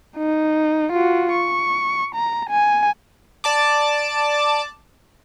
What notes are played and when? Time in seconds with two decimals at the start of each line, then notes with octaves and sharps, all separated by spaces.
0.17 D#4
0.93 F4 F#4
1.32 C#6
2.15 A#5
2.50 G#5
3.44 D5 A5 D6